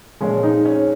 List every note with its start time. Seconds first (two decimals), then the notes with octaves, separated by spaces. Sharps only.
0.21 A#2 F3 G#3 C#4
0.43 D#4
0.65 C#4